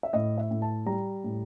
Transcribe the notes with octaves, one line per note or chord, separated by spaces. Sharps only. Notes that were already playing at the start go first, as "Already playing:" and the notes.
E5
A2 D#5
E5
A2
A5
G3 A#5
A2